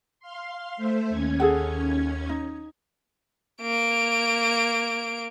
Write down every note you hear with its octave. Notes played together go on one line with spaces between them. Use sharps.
F5 C6
A3 C5 E5
D#2 C#4 G#6
G#4 A4 F#5
D#4
A#3 D7